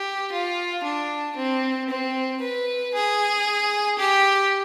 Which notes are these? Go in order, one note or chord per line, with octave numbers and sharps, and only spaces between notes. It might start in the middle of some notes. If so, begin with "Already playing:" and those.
Already playing: G4
F4
D4
C4
C4
B4
G#4
G4